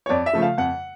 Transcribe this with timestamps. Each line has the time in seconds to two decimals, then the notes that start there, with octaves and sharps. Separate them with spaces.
0.06 C#5
0.09 F2 D5
0.26 E5
0.33 C#3 F3 A3
0.42 F5
0.58 F2 F#5